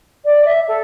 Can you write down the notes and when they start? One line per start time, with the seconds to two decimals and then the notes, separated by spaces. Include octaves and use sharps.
0.25 D5
0.45 E5
0.68 A4